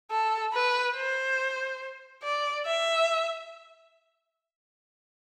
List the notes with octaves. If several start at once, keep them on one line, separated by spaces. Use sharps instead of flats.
A4
B4
C5
D5
E5